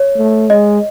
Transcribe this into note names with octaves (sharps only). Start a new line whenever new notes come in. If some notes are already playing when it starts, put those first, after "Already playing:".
Already playing: C#5
A3
G#3 D#5